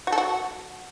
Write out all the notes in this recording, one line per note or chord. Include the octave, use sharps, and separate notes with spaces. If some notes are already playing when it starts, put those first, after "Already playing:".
F#4
A4
F#4